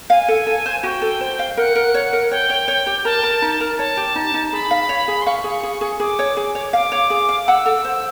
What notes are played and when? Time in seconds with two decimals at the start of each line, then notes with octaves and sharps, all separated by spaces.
0.10 F5 G#5
0.28 A4
0.47 A4
0.66 C5
0.83 F#4 G5
1.02 A4
1.21 C5
1.39 F5
1.57 A#4 F#5
1.76 A#4
1.94 C#5
2.13 A#4
2.31 C#5 G5
2.50 C#5
2.68 C#5
2.86 G4
3.05 A#4 A5
3.23 A#4
3.42 D#4
3.60 A#4
3.78 C#5 A5
3.97 G4
4.15 D#4
4.34 D#4
4.52 G#4 B5
4.71 F5
4.89 C#5
5.08 G#4
5.22 C6
5.26 F5 C#6
5.44 G#4
5.63 G#4
5.81 G#4
6.00 G#4 D6
6.19 C#5
6.37 G#4
6.55 C#5
6.73 F5 D6
6.92 C#5
7.10 G#4
7.29 F5
7.47 F#5 E6
7.66 A4
7.84 C5